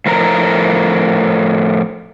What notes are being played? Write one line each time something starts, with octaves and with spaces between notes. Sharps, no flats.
A2 F3 A4 A#4 A#5